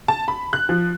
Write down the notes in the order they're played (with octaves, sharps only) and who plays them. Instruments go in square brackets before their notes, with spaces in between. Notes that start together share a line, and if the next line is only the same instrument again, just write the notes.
[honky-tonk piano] A5
B5
F#6
F3